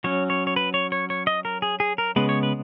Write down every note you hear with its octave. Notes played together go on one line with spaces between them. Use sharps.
F#3 C#4 C#5
C#5
C#5
B4
C#5
C#5
C#5
D#5
A#4
G#4
G#4
A#4
C#3 G#3 B3 B4
C#5
B4